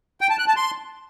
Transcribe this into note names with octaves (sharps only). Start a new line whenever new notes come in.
G5
A5
F#6
A5
C6